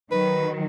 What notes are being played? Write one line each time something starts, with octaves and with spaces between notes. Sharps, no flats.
D#3 F#3 B4